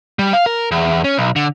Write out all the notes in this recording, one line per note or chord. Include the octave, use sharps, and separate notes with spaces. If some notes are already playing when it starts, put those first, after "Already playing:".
G3
F5
A#4
E2
C#4
B1
D3